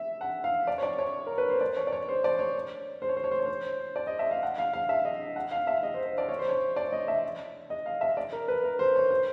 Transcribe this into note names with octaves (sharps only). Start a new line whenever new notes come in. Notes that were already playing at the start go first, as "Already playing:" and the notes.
Already playing: E5
F#5
F5
D5
C#5
D5
C#5
A#4
B4
C5
D5
C#5
D5
C#5
C5
D5
C#5
C5
C#5
C5
C#5
C5
C#5
C5
D5
D#5
E5
F5
F#5
F5
F5
E5
D#5
F#5
F5
E5
D#5
C5
C5
D5
C#5
C5
C#5
D5
D#5
E5
D#5
F5
E5
D5
A#4
B4
A#4
C5
C#5
C5